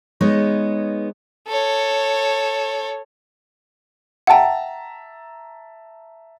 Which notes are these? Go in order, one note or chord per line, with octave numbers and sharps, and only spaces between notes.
G#3 B3 D#4 C#5
A4 C#5
E5 F#5 G5 A5 A#5